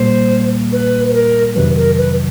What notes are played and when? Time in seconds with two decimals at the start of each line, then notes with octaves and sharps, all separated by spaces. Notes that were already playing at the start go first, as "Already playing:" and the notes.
Already playing: A#2 G3 A#3 C5
0.72 B4
1.09 B4
1.13 A#4
1.55 F2 C3 D#3 F#3 B4
1.76 A#4
1.98 B4